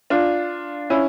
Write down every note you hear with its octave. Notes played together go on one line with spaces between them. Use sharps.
D4 F4
C#4 E4